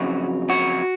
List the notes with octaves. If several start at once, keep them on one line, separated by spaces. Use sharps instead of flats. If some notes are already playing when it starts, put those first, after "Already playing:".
Already playing: F2 C#3 F#3 F#4
F#4